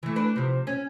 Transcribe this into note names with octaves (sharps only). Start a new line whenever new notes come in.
E3 A3
D4 B4
C3 F3
C#4